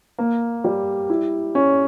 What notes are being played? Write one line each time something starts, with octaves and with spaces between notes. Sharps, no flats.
A#3
G3
E4
C#4